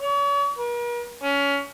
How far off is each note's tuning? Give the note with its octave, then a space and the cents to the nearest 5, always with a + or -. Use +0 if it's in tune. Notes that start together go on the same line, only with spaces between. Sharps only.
C#5 +40
A#4 +45
C#4 +25